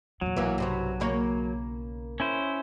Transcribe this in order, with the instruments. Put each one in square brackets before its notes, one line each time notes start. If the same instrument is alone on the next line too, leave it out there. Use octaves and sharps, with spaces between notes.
[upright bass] E2 A#2 [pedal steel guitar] F#3
[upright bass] B1 [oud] E3 A#3
[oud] G2 C3 F#4
C#3 A#3 C#5
[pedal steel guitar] C#4 E4 C5